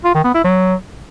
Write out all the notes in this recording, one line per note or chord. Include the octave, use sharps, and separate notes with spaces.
F4
D#3
B3
E4
F#3